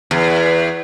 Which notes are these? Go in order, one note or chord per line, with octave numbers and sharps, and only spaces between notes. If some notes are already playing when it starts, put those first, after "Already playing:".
E2